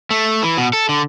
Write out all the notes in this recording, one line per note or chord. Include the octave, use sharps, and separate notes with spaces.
A3
E3
B2
A4
D3